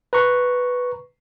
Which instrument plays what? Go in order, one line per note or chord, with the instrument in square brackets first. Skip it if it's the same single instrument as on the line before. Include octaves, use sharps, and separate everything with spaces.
[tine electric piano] B4 A#5 C#6